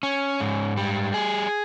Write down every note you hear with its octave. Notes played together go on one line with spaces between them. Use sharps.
C#4
G#2
G3
G#4